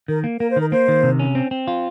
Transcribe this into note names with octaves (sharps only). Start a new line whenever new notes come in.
D#3 A#4
A#3
A#3 A#4
C5
D#3 A#4
A#3 C5
D#3
C3
C#4
C4
C4
F4